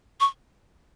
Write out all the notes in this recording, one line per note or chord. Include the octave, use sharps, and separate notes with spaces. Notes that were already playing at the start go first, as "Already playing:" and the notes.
C#6